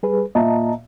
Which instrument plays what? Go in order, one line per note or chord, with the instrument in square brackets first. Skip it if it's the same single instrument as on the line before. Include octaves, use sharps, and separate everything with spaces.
[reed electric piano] G3 G#4 B4
[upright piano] A#2 E5 [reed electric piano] D#5 A5 A#5